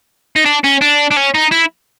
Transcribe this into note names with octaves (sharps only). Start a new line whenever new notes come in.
D#4
D4
C#4
D4
D4
C#4
D#4
E4